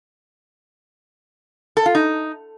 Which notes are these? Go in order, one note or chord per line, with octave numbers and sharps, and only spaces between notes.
A4
F4
D#4